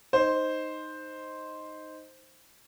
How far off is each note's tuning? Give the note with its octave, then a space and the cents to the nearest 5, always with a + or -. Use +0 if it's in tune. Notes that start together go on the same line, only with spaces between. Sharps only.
D#4 +0 C5 +0